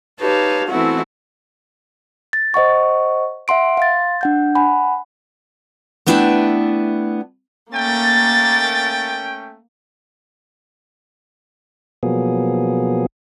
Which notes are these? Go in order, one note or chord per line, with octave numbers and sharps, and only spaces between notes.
D#4 G4 B4 C#5 F5 A5
E3 A3 B3 C4 E4 F#4
A6
C5 D#5 F#5 C#6
E5 F#5 C6 D7
F5 C6 A6
D4 F#5 G6
F#5 G#5 B5
A3 B3 D4 E4 E5 G5
A3 A#3 C#4 G5 A6
B2 F3 F#3 A#3 B3 G#4